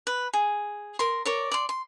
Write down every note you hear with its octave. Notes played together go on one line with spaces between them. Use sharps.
B4
G#4
A#4 C6
A#4 C#5 D5
D5 C6
C6